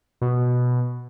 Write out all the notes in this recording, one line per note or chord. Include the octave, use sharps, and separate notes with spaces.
B2